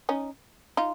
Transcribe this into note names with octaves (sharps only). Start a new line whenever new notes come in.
C#4 D#4
D#4 F4